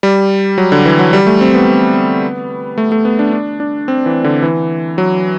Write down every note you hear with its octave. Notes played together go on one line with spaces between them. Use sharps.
G3
F#3
D3
E3
F#3
G3
A3
C4
B3
A3
A3
B3
D4
D4
D4
C4
E3
D3
E3
F#3